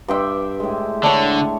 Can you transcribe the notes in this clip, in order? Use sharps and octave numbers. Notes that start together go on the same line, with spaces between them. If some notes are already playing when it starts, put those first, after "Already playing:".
G2 E5 G5 C6
A2 G#3
D3 D4 C#5